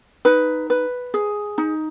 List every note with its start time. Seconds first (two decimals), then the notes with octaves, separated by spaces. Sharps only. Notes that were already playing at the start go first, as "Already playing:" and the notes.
0.25 D#4 B4
0.70 B4
1.14 G#4
1.58 D#4